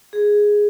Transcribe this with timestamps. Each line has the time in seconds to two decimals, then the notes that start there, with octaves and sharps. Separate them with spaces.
0.13 G#4